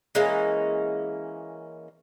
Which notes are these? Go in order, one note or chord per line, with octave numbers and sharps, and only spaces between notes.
E3 G#3 A#3 C#4